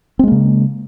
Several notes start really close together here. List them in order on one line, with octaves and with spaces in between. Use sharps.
C4 G#3 A#3 C#3